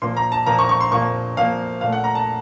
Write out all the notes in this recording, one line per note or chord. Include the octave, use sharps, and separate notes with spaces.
A#2 F3 A#3 C6
A#5
A5
A#2 F3 A#3 A#5
C#6
C#6
C6
A#2 F3 A#3 C#6
A#2 F3 A#3 F5
A#2 A3 F5
F#5
A#5
A5